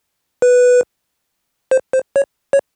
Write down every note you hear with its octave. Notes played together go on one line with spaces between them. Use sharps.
B4
C5
C5
C#5
C#5